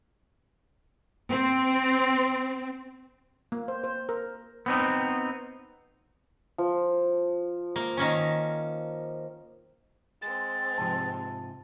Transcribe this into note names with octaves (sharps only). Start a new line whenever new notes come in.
C4
A#3
C5
C5
A#4
B3 C4 D#4
F3
A#3
D#3 A#3 C#4
G#3 C4 A6
G#2 C3 F3 A5